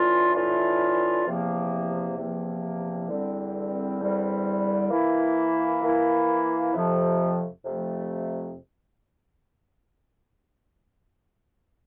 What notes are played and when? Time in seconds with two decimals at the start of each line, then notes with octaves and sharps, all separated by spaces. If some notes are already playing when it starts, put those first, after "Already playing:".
Already playing: A2 E3 A3 D4 F4
0.34 A2 E3 A3 D4 F4
1.26 E2 C3 F3 A#3
2.17 E2 C3 F3 A#3
3.08 E2 D3 G3 C4
3.99 E2 D3 G3 C4
4.91 E3 A#3 E4
5.82 E3 A#3 E4
6.73 F2 C3 F3 A3
7.65 F2 C3 F3 A3